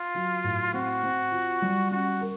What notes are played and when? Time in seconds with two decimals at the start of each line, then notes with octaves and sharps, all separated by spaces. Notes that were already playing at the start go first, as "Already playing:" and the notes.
Already playing: F4
0.15 F#3
0.44 A2
0.74 C4 F#4
1.03 C4
1.32 F4
1.62 G3
1.91 C#4 F#4
2.21 A#4